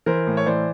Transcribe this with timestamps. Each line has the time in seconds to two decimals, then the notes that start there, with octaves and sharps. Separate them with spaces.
0.06 E3 A#4 C5
0.27 A2
0.37 C#5
0.46 E3 C5 D5